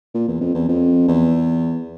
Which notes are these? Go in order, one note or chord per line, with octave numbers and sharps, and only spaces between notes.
A#2
E2
F2
E2
F2
E2